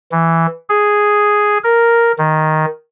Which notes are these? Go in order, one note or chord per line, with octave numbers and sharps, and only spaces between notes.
E3
G#4
A#4
D#3